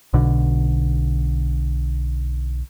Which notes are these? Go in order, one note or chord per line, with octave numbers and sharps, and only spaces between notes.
B1 B2 D3